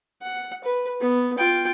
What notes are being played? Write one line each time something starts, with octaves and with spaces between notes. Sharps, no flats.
F#5
B4
B3
F4 G5